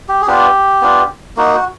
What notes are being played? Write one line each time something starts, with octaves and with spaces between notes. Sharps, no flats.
G4
G#4
B3 D4 F4 G4
B3 D4 F4
A#3 D#4 F#4
F#4